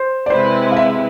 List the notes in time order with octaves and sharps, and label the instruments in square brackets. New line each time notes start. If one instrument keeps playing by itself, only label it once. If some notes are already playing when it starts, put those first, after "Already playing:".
Already playing: [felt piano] C5
D5
[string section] C3 G#3 C4 E4 B4 [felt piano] C5
[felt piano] F5
E5